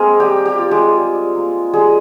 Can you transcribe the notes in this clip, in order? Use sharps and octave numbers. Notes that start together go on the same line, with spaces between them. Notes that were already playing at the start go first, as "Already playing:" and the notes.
Already playing: G#3 A#3 C4 G#4 A#4
G3 G4
G4
F4
G#3 G#4
G3
A#3
G3 G#3 G#4